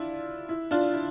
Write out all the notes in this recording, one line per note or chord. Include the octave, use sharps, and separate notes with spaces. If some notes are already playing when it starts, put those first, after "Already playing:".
Already playing: D4 E4 F4
E4
D4 F4
E4